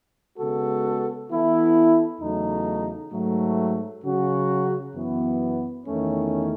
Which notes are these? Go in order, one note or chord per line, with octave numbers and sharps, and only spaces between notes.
C#3 G#3 B3 F#4 A4
E3 B3 E4 A4
E2 C#3 F#3 A3 D#4
G#2 F#3 A3
C#3 F#3 C#4 F#4
F#2 E3 B3
E2 D#3 A3 C#4